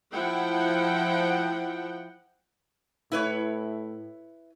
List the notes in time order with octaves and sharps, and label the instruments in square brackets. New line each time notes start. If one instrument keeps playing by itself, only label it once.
[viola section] F3 E4 F#5 G5
[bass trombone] A2 [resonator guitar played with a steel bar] E4 B4 C#5